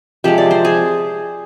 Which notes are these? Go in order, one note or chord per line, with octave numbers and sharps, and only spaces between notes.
C3 F3 G#3 G4
D5
C5
G#4